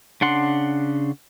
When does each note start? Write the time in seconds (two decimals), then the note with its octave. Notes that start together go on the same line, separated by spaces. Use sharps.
0.21 C#3 D4 F#5 C6